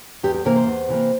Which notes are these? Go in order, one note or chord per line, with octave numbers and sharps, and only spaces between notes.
E2 G4
G4
C3 E3 A#3 A#4
C5
E2
C3 E3 A#3